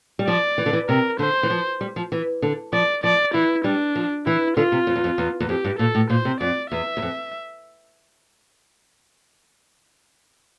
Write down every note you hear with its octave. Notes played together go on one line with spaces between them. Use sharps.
G3
F3 D5
E3
D3
E3
C3 A#4
D3 C5
E3
F3
G3
F3
E3
D3
F3 D5
F3 D5
E3 E4
G3 D4
F3
E3 E4
D3 F4
C3
F2
E2
F2
E2
E2
F2 G4
G2
A#2 A4
A2
A#2 C5
C3
F2 D5
E2 E5
E2
F2